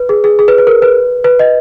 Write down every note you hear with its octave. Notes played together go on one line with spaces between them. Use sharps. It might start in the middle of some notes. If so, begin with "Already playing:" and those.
Already playing: B4
G#4
G#4
G#4
B4
B4
A#4
B4
B4
D#5